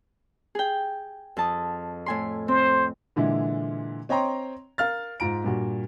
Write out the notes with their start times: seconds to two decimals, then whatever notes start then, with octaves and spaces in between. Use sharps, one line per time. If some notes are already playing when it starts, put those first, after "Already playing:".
0.55 G#4 G5
1.37 F2 A5 D#6
2.06 A2 G#5 C6
2.48 C4 C5
3.16 A#2 D3 E3 G#3 E4
4.09 C4 C#5 D#5 G5 A#5 C6
4.78 A#4 F5 F6 A6
5.20 G#2 F4 A#5 D7
5.44 G2 A#2 F#4